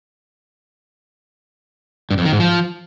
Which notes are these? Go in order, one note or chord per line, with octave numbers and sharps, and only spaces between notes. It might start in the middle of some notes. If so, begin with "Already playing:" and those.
G2
F2
D#3
G#2
F3